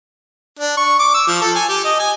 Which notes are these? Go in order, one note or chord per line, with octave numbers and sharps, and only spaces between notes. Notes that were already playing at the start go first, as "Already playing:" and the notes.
D4
C#6
D6
E6
F3
A4
G#5
G4
D#5
G#5